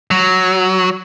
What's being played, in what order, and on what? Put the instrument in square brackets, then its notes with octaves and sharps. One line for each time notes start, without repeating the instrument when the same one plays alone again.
[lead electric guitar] F#3